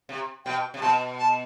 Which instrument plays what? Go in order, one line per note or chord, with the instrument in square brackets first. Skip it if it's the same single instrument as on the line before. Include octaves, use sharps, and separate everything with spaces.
[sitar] C3
[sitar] B2 [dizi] G5
[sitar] C3
[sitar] B2 [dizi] A5
[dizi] A5